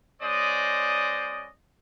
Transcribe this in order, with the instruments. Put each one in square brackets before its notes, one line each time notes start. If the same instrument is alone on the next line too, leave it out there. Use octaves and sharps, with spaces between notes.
[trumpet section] G#3 C#4 C5 D5 D#5 D#6